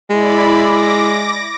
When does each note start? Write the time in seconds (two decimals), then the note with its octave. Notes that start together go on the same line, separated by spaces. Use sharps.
0.10 G#3 E4 D5 B5
0.61 D6 A#6